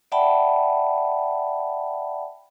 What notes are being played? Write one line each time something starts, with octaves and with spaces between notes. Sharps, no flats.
D5 E5 F#5 G5 A5 B5